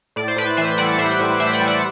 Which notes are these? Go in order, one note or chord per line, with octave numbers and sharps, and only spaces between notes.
A2 D5
C5
A2 B4 D5
E3 C5 E5
G3 D5 F#5
A2 C5 E5
A2
E3 C5 E5
D5 F#5
G3
D5 F#5